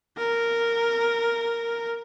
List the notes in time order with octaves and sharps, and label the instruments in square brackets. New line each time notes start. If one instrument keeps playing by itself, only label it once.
[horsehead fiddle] A#4